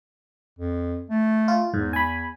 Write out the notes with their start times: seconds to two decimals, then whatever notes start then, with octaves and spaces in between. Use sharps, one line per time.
0.59 F2
1.10 A3
1.48 F4
1.74 E2 G#2
1.93 G#5 B5